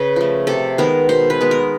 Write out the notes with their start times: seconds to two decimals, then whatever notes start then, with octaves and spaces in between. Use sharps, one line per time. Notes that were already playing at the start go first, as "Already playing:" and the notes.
Already playing: C#3 B4
0.16 F3 A3
0.47 C3 A4
0.78 D#3 G#3 B3 A#4
1.09 B2 C5
1.30 B4
1.41 G#3 B3
1.51 A#4